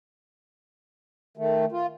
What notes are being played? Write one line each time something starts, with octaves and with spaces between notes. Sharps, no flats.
D#3 A3
F4